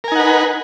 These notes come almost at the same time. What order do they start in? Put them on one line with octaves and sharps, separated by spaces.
A#4 G#5 D#4 F#5 B4